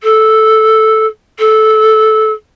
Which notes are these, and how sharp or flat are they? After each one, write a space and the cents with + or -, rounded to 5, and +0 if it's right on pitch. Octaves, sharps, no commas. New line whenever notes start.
A4 -5
A4 -15